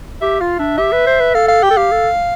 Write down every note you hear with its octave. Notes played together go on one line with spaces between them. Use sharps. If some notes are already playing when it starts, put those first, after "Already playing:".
G4 E5
F4 F5
D4 E5
G4 E5
B4
C5
B4
A4 F5
F5
G4 G5
A4
G4 F5
A4